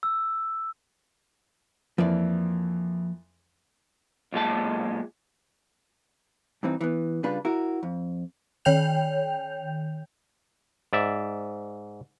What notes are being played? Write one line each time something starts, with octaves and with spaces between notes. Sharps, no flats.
E6
F2 E3 F3 A#3 D5
B1 A#2 G#3 A5
G2 E3 C4 D#4
E3 B3
C#3 G3 D4 F4 B4
E4 F#4 A#4
F2
D#3 C#5 G5 G6 F7
G#2 D5 E5